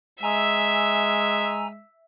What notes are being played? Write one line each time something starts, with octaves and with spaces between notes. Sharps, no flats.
G#3 E5 G#5 A#5 E6